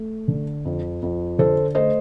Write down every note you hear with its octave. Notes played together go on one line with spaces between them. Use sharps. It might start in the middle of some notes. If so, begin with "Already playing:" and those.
Already playing: A3
D3
F2
F2
D3 A4 C5
A3 C5 D#5